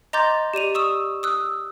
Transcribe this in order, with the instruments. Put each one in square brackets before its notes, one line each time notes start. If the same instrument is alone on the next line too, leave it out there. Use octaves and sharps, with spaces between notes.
[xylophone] D#5 A#5 C6 D6 G6 A6
G4 D5 D#7 F7
C#6 D#6 E6 E7
D#6 E6 F#6